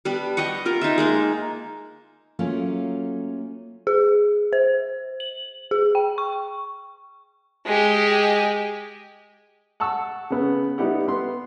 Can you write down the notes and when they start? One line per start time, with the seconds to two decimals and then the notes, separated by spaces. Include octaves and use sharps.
0.05 G3 B3 D4 B5
0.37 G4 D#5 F#5 C#6
0.65 F4 A#4
0.81 D#4 F4 E5
0.98 G#3 A#3 D#4
2.39 F#3 A3 A#3 C#4 F4
3.87 G#4
4.53 C5
5.20 F#7
5.71 G#4
5.95 G5
6.18 C#6
7.66 G#3 G4
9.80 F#5 A5 C#6 E6
10.30 C#3 B3
10.78 G3 B3 D#4 E4 G4 F#5
11.08 B3 C6